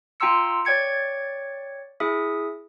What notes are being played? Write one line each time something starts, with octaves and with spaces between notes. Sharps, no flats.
F4 G5 A#5 C6 E6 C#7
C#5 D5 G5 G#6 C#7
E4 G#4 E5 D#6